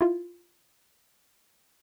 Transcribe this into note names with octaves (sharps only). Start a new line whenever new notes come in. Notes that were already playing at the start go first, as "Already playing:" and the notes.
E4 F4